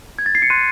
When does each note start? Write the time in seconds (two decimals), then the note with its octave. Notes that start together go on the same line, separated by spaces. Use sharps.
0.19 G#6
0.26 A6
0.35 C7
0.42 C#7
0.50 C6 F#6 D#7